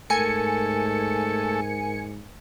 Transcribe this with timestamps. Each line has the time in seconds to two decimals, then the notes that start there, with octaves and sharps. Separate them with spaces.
0.10 G#2 A3 A4 A#4 G#5 C#7